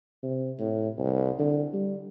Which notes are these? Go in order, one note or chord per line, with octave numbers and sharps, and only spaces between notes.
C3
A2
C2
D3
G3